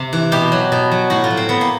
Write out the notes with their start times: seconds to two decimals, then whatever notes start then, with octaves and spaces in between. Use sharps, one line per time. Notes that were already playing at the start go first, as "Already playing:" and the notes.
Already playing: C3
0.13 E3
0.32 B2 G4
0.52 F#3
0.72 B2
0.92 F#3
1.10 A2 F#4
1.24 F4
1.30 F#3
1.37 C4
1.49 A2 B3
1.61 A#3